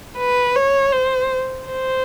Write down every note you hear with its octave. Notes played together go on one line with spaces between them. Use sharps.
B4
C#5
C5
C5